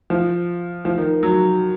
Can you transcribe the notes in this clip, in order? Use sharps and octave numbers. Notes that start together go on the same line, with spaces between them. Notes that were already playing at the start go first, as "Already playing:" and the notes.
F3
F3
D#3
F#3